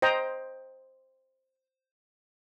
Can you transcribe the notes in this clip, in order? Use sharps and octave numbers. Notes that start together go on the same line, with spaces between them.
C5 D#5 G5 A#5